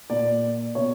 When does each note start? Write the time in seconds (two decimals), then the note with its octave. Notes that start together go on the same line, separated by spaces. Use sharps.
0.10 A#2 D5
0.75 B2 C#5